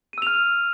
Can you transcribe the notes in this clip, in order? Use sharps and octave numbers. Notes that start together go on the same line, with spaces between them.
E6 F6 D#7 F7